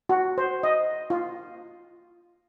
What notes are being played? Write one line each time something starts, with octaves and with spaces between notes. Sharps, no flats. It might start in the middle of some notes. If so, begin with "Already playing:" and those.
F#4
C5
D#5
F4